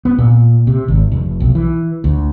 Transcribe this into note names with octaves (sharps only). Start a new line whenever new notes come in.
B3
A#2
C3
G#1
F1
B1
E3
D2